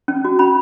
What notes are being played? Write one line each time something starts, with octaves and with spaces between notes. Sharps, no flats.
C#4
F#4
C#4 B5